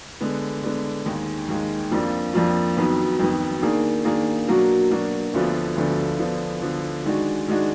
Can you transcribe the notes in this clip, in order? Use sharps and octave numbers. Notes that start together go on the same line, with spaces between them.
D3 G#3 B3
D3 G#3 B3
D#2 D#3 G#3
D#2 D#3 G#3
F2 F3 A#3 D4 F4
F2 F3 A#3 D4 F4
F2 D#3 F#3 B3
F2 D#3 F#3 B3
D#3 A#3 D4 G#4
D#3 A#3 D4 G#4
B2 F#3 A#3 D4 F#4
B2 F#3 A#3 D4 F#4
D2 D3 F3 B3 F4
D2 D3 F3 B3 F4
D3 F3 B3
D3 F3 B3
D#3 G#3 D4 F#4
D#3 G#3 D4 F#4